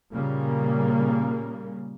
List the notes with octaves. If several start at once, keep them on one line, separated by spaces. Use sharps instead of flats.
A#2 C#3 G3 A#3